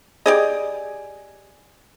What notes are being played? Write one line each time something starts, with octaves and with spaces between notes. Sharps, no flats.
G4 G#4 D5 D#5